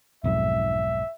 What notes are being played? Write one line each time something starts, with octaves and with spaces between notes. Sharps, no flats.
B1 F2 G#2 E5